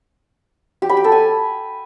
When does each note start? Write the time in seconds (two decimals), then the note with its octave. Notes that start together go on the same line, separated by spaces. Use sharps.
0.82 G4
0.89 B5
0.97 G4
1.04 A4
1.12 G#5